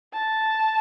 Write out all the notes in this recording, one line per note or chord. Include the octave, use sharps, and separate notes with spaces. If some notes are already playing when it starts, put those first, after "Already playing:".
A5